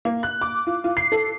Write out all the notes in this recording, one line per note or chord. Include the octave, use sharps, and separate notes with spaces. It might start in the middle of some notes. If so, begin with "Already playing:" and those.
A#3
F#6
D6
F4
F4
C7
A4